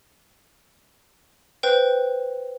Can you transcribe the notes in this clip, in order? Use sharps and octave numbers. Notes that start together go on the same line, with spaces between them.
B4 C5 G5